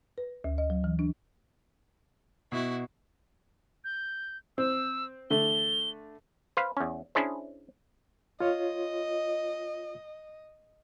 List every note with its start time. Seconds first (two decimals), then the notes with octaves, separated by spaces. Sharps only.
0.18 B4
0.44 D2
0.58 D#5
0.70 F#3
0.84 E3
0.99 D4
2.52 B2 E4 F#4
3.84 G6
4.58 C4 E6
5.30 D3 A3 G7
6.57 B4 C5 F5
6.77 E2 C#4
7.15 C#4 D4 E4 G#4 C5
8.40 F4 C#5 D#5